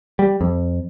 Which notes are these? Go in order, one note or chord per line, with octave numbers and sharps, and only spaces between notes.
G3
F2